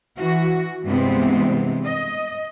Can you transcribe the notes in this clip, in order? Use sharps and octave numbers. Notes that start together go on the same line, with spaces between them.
E3 F#4
G2 C3 E3 G#3 B3 C4
D#5